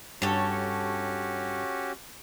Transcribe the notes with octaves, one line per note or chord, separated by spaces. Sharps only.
G2 C#4 F#4 G4 A4 C#5